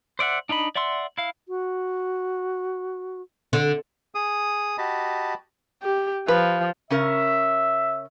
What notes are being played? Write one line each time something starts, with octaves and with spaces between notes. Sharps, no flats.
C5 D5 E5 F#5
D4 D#4 D#5 B5
D5 E5 F#5 C6 E6
E4 F5
F#4
D3
G#4 D#6
F#4 G4 D#5 A5 B5
G4
F3 B4
C#3 C#4 A#4 E5